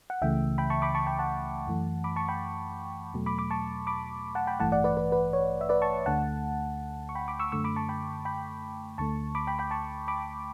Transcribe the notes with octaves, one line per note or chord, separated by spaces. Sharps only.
F#5
C#2 C#3 E3 A3 E5 G5
G5 B5
A5 C#6
B5 D6
A5 C#6
G5 B5
F#5 A5
F#2 E3 A3
B5 D6
A5 C#6
G5 B5
E2 B2 F#3 A3
B5 D6
B5 D6
A5 C#6
B5 D6
F#5 A5
G5 B5
A1 G2 E3 A3 F#5 A5
D5 F#5
B4 D5
B4
B4
C#5
E5
B4 D5
A5 C#6
D2 D3 A3 F#5 A5
C#6
G5 B5
B5 D6
C#6 E6
F#2 D3 A3 C#6 E6
B5 D6
A5 C#6
G5 B5
G5 B5
D2 D3 A3 A5 C#6
B5 D6
G5 B5
G5 B5
A5 C#6
B5 D6